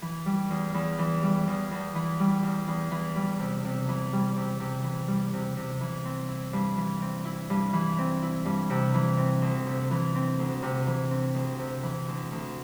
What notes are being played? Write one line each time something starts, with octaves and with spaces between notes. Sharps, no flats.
E3
G3
E2
E2
E3
G3
E2
E2
E3
G3
E2
E2
E3
G3
C3
C3
E3
G3
C3
C3
E3
G3
C3
C3
E3
C4
E4
G2
E3
C4
E4
G2
E3
C4
E4
G2
C3
E3
C4
D2
C3
E3
C4
D2
C3
E3
C4
D2
C3
E3
D2
D2